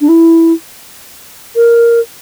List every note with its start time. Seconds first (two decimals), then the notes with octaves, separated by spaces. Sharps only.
0.01 D4
0.08 E4
1.56 A#4